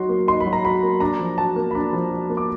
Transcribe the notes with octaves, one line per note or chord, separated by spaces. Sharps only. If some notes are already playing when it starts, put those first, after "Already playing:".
Already playing: F#3 D#4 F#4 C6
A#3
D#4 C6
B5
F#3
A#5
F#4 B5
A#3
D4 A#5
F3
F#4 A5
A#3
B5
D4 A#5
F3
F#4
A#3
D6